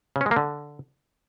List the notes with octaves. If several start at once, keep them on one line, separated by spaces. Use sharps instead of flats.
C#3
C#4
G#3
A#3
D3